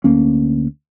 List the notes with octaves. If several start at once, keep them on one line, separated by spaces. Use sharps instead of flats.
D2 A#3 C#4